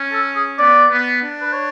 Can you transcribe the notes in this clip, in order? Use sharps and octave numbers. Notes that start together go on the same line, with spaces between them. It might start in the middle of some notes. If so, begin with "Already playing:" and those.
Already playing: C#4
A4
G#4
B3 D5
B3
D4
B4
C#5